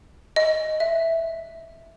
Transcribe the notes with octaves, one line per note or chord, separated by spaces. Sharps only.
D#5
E5